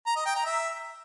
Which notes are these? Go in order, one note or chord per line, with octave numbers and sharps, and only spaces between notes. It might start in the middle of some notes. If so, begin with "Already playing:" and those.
A#5
D#5
G5
A#5
E5